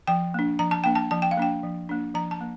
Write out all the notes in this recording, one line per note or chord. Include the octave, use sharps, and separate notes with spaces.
F3 G5
A#3 D4
F3 A#5
A5
A#3 D4 G5
A5
F3 A5
G5
F5
A#3 D4 G5
F3
A#3 D4
F3 A#5
A5
A#3